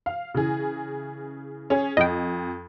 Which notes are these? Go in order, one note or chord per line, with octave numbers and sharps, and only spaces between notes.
F5
C#3 E3 G#4
C#4 G#4 C#5
F2 D#5 G5